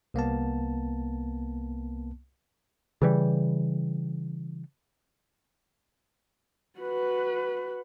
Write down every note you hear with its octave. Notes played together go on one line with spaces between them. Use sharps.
C2 A#3 B3 A5
C#3 E3 G3
F#4 B4